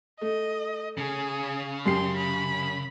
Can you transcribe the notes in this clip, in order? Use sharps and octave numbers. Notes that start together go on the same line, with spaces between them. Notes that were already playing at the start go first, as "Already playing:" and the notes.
A3 D#5
C#3 G#4
F#2 G4 C6 C7
B5